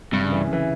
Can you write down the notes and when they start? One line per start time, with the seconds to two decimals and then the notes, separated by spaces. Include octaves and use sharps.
0.12 G2 C3
0.22 C#3
0.32 E3
0.43 C#3
0.53 E3